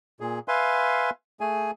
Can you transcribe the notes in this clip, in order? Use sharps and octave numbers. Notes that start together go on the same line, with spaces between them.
A#2 G#4
B4 E5 F5 G#5 C6
A3 G#4 G#5